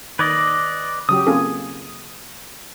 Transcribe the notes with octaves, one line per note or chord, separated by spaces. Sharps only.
D#3 B4 D5 D#5 G#6
A#6
C#3 F#3 G4 D#6
A#3 C4 C#4 F4 G#4 A4